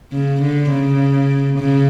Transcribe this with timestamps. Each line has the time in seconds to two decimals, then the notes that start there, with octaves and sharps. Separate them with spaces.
0.13 C#3
0.42 D3
0.71 C#3
1.59 C#3